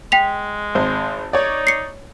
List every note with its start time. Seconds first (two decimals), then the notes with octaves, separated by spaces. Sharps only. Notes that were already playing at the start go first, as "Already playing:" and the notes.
0.12 G#3 G5 B6 F7
0.75 G#1 C5
1.33 D#4 C#5 D5
1.67 C7 C#7